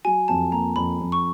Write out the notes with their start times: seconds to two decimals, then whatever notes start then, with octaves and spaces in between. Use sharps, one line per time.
0.05 F#3 G#5
0.28 F2 A5
0.52 A#3 A#5
0.76 F2 B5
1.00 F2
1.12 C#6